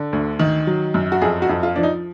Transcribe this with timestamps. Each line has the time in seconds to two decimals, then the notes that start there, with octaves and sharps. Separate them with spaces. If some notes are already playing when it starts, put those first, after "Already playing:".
Already playing: D3
0.13 D2
0.39 D#3
0.67 F#3
0.94 F#2
1.12 F#4
1.21 F2 G#4
1.42 F#4
1.49 F2
1.63 F4
1.76 F3 D4
1.83 D#4